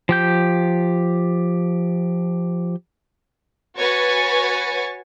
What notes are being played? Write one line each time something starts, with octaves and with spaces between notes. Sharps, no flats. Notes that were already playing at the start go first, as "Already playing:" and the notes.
F3 G4 G6
F#4 B4 C#5 G#5 C#6 A6